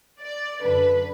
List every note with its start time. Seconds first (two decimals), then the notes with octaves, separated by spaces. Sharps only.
0.19 D5
0.62 F#2 D3 F#3 D4 B4